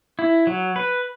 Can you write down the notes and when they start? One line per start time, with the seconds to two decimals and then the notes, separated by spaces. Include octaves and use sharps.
0.19 E4
0.47 F#3
0.76 B4